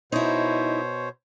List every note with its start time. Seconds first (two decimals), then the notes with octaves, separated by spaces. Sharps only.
0.12 B2 D#4 E4 C5 C#5